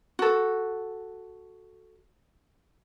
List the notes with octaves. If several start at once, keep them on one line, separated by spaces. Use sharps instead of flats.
F#4 A4